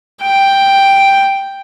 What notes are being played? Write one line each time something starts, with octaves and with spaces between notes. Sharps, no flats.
G5